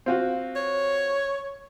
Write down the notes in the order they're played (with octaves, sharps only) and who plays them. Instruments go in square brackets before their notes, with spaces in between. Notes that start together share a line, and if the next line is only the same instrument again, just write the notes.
[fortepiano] C4 F4 F#4
[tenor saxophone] C#5